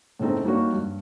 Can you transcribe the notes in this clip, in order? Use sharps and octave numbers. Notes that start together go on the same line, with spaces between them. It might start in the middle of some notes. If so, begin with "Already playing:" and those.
A2 C#3 A3 C4 D#4
G3 A#3 D#4 F#4 C#5
G2